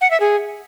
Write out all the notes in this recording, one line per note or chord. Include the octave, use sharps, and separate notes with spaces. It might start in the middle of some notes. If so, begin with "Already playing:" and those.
F#5
E5
G#4